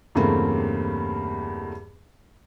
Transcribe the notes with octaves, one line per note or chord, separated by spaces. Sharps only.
E2 G2 C#3 A3 A#3 C4